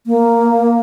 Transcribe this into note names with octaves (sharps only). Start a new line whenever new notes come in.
A#3